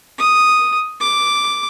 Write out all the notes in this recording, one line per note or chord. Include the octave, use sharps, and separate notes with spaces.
D#6
D6